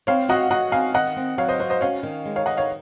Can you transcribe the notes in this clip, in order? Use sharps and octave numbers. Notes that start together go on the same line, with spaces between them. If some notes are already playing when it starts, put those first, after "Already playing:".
C4 C#5 F5
F#4 D#5 F#5
F#4 D#5 F#5
C4 F5 G#5
D#3 D#5 F#5
C4
F#3 C#5 F5
C5 D#5
F#4 C5
C5 D#5
C#4 C#5 F5
D#3
G#3
C#5 F5
D#3 D#5 F#5
C#5 F5